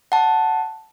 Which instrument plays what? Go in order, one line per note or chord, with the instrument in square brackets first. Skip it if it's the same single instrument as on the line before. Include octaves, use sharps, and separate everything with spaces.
[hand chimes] F#5 A5